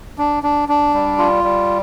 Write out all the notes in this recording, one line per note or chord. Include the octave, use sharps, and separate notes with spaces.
D4
D4
D4
G3
F4
G3